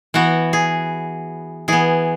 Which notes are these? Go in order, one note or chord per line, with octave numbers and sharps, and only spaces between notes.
E3 B3 F#4
G#4
E3 B3 G#4